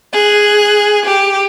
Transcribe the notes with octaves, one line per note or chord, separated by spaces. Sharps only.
G#4 F#6
G4